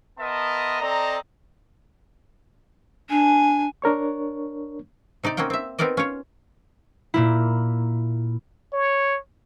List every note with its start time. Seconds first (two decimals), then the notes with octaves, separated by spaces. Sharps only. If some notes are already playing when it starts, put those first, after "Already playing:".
0.19 B3 A#4 D#5 E5 A5 C6
0.80 C4 A4 D5 D#5 A#5
3.10 D4 G#5
3.82 D4 A#4 C#5 C#6
5.24 C3 D#4 G4 D5
5.37 A#3 C4 C#4 F#5 G5
5.50 C4 E5
5.79 B3 C4 D#4 A#4 D5 D#5
5.97 C#4 F4 C#5
7.14 A#2 A#3 E4
8.73 C#5